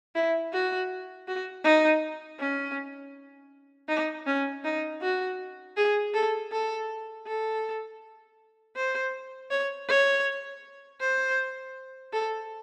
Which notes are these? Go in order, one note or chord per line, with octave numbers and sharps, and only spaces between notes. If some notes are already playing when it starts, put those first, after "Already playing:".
E4
F#4
F#4
D#4
C#4
D#4
C#4
D#4
F#4
G#4
A4
A4
A4
C5
C#5
C#5
C5
A4